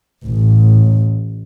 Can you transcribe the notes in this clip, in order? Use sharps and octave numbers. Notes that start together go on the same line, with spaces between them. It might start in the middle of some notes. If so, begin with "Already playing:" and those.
A1